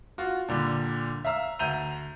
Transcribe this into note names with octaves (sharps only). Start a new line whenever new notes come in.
F4 F#4
A#2 D3 G3
E5 F5 A#5 E6
D2 E5 A#5 G6 D#7 F7